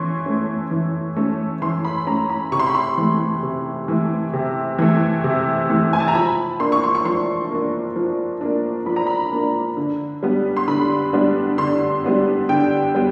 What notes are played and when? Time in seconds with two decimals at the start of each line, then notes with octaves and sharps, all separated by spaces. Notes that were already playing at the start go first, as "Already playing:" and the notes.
Already playing: E3 C#4 C6 C#6
0.26 A3 C#4
0.71 E3
1.16 A3 C#4
1.62 E3 C6
1.85 B5
2.07 A3 C#4 A#5
2.30 B5
2.52 C3 C#6
2.59 C6
2.67 B5
2.75 C6
2.97 E3 A3
3.43 C3
3.88 E3 A3
4.33 C3
4.79 E3 A3
5.24 C3
5.70 E3 A3
5.93 G#5
6.00 A5
6.08 A#5
6.15 F3 B5
6.60 A#3 D4 C6
6.72 C#6
6.84 C6
6.95 C#6
7.05 F3 C6
7.51 A#3 D4
7.96 F3
8.41 A#3 D4
8.86 F3 B5
8.96 A#5
9.07 B5
9.32 A#3 D4
9.77 D3
10.23 G3 B3 D4
10.56 C6
10.68 D3 B5
11.13 G3 B3 D4
11.58 D3 C6
12.04 G3 B3 D4
12.49 D3 G5
12.95 G3 B3